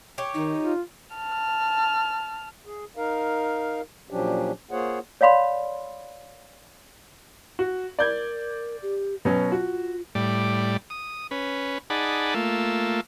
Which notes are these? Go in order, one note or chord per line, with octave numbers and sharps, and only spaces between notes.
G4 C#5
D#3 D#4
F4
A5 F6
G#4
D#4 A#4 F5
A#2 F3 F#3 C#4 D4 G4
A#3 F4 G#4 C5 C#5 F#5
C#5 D5 F5 B5 C6
F#4
A#4 D5 G6 G#6
G4
B2 F#3 C#4 B4
F4 F#4
A2 G3 D5
D#6
C#4 B4
D#4 G#4 D5 F#5 A5 B5
A3 A#3 F4 E6